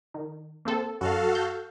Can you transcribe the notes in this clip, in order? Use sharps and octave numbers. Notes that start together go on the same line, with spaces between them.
D#3
A#3 C4 A4
F#2 F#4 A4 F5
G6